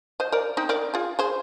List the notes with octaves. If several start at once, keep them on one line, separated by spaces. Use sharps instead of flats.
C5 D#5
A#4 D5
C4 D#4
A#4 D5
F4 G#4
G#4 C5